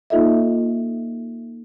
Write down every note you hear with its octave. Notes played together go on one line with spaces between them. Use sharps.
A#3 D#4 F4 A4 D#5 E5